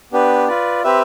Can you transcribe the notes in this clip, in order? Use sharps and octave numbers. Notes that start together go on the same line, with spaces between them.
B3 D4 G4 B4
F4 B4 D5
C4 G4 B4 E5